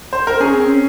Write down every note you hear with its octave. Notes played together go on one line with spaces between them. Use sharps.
C5
A#4
C#4 G#4
C4
C#4